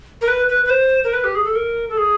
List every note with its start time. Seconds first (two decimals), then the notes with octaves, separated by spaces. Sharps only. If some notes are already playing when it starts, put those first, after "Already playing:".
0.21 A#4
0.28 B4
0.49 B4
0.65 B4
0.70 C5
1.04 A#4
1.13 B4
1.24 G4
1.35 G#4
1.44 A4
1.55 A#4
1.89 A4
1.97 G#4